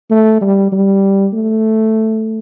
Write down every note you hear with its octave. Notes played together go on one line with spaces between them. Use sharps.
A3
G3
G3
A3